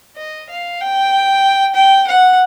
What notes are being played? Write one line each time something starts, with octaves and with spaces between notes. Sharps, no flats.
D#5
F5
G5
G5
F#5